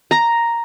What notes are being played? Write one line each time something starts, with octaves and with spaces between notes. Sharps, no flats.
A#5